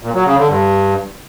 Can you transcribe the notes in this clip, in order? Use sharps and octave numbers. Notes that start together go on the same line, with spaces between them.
A#2
F#3
C#3
D3
G2